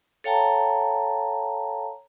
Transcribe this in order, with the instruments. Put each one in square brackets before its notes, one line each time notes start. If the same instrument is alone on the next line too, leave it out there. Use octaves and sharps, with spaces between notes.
[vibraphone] A4 C#5 F5 G5 A5 A#5